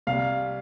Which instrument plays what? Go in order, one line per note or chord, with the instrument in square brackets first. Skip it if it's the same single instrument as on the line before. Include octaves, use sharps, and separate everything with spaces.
[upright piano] C2 F5